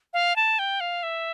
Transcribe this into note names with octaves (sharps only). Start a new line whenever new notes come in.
F5
A5
G5
F5
E5